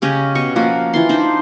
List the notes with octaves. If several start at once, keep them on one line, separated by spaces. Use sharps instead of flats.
C#3 C#4 G4 D#5
B2 D#5 C#6
F3 A#3 F#4
E3 F4 C6
D4 D#4 C5